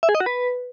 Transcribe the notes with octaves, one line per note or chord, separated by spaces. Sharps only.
E5
G#4
D#5
F#4
B4